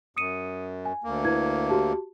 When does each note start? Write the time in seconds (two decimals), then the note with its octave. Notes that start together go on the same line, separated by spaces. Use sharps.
0.17 F#2 D#6 C#7 D#7
0.85 G#5
1.04 D2 A#3
1.25 E4 B4 G#6
1.70 F#4 G4 A5